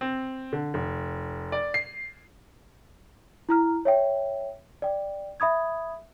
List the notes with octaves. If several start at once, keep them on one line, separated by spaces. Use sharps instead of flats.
C4
D3
F1
D5
C7
E4 A#5 F6
C#5 E5 G5
D5 G5
E5 B5 D#6 G#6